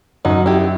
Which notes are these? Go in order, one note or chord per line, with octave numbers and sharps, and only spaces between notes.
F#2 D#4 F#4
E4 G4